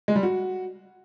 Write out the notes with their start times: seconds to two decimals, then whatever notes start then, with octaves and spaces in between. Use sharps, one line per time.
0.08 G#3
0.16 G3
0.23 F#4